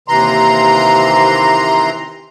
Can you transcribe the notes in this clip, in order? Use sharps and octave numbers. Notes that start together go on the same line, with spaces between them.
D#2 C3 E3 A#5 C6